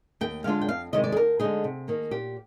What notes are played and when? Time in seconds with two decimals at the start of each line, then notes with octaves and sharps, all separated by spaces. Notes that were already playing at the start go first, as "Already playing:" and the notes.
0.21 D#2 G5
0.44 D3 G#3 D4 F4 F5
0.61 G5
0.68 F2 F5
0.93 C3 D#3 G#3 D#5
1.04 D5
1.12 G#4
1.16 D2 A#4
1.40 D3 G#3 D#4 G#4
1.64 C3
1.88 D#3 A#3
2.11 A#2 G4